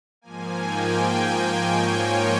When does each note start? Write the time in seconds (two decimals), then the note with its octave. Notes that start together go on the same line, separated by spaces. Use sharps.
0.22 G#2 F3 A#3 G#5
0.58 G5
1.66 C#5